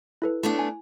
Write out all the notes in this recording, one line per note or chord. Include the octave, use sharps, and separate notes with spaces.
E4 A4 B4
A3 B3 D4 E4
G#5